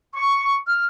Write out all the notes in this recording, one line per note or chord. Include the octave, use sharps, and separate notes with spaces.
C#6
F6